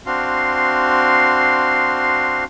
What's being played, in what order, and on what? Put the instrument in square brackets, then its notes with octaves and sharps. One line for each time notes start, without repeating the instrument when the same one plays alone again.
[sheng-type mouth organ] C4 D4 F#4 F5 C6